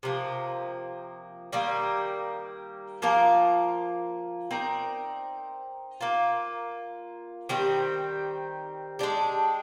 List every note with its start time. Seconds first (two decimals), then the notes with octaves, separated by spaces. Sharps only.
0.03 C3 F3 A#3
1.52 D#3 G3 A#3
3.02 F3 A#3 F4 A#4
4.51 C4 D#4 A#4 D5
6.00 A#3 F4 A#4
7.49 D#3 G3 C4 G4
8.99 G#3 D4 G4